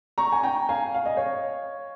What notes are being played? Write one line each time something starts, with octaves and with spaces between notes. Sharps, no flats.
A#5 C#6
G#5
G5 A#5
F5 G#5
F5
D#5
C#5 F5